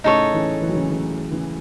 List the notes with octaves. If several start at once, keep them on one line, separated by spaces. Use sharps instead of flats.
A2 C#3 D#4 A4 C#5
C#3 E3
E3
F#3
C#3 E3
C#3 E3
C#3 E3